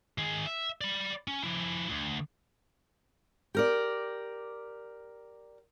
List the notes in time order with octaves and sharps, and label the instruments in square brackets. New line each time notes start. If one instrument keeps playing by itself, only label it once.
[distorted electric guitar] D#3 G#4
E5
D5 B5
C#4
F3 E4
D2
[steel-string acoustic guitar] G4 A#4 D5